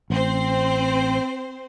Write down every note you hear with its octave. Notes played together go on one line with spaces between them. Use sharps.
A1 C4 C5